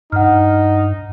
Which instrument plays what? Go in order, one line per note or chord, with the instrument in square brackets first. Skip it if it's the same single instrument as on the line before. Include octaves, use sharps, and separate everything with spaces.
[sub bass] G2 [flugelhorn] D#4 [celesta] F#5 F6